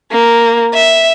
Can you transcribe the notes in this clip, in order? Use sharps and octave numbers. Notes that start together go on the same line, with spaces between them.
A#3
E5